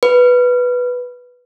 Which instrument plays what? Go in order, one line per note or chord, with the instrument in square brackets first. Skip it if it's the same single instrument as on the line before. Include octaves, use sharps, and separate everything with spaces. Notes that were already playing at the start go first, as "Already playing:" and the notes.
[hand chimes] B4